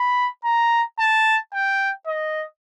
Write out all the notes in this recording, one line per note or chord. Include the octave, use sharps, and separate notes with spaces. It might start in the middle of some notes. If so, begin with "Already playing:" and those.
Already playing: B5
A#5
A5
G5
D#5